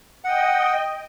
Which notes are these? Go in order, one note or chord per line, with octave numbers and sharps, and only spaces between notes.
D#5 F#5 G5